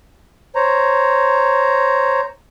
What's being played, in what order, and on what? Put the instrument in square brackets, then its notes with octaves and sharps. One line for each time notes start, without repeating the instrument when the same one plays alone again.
[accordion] C5 C#5 A#5